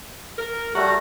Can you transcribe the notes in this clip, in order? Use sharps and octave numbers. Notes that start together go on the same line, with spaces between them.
A#4
G3 A3 F#4 A#5